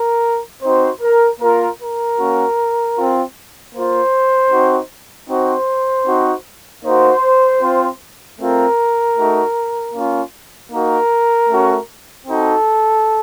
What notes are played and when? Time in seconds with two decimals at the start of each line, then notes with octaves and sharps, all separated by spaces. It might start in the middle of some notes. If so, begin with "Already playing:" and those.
Already playing: A#4
0.62 C4 D#4 F#4 C5
1.01 A#4
1.40 A#3 F4 A#4
1.79 A#4
2.18 A#3 C#4 F#4
2.95 C4 F4
3.73 A#3 F4 C5
4.50 C4 D#4 F#4
5.28 C4 D#4 F#4 C5
6.06 C4 D#4 F#4
6.83 A#3 D#4 F#4 C5
7.61 C4 F4
8.38 A3 C4 F4 A#4
9.16 A3 D#4 F#4
9.94 A#3 C#4 F4
10.71 A#3 D#4 F#4 A#4
11.49 A3 C#4 F#4
12.27 C4 D#4 F#4 A4